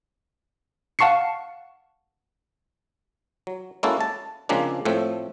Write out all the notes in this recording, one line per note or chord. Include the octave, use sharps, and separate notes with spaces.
F5 F#5 A5 C#6 C7 C#7
F#3
G#3 A#3 C#4 E4 F#4 A4
A5
C#3 F3 G#3 A#3 C4 D4
A2 F3 A3 C4